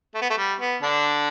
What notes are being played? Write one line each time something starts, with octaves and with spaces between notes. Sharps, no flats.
A3
B3
A3
G3
B3
D3 D4